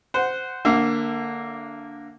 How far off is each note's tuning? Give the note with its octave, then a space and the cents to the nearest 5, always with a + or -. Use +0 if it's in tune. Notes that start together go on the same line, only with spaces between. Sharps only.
C5 -15 F#5 +0
D3 +0 A#3 +0 E5 +30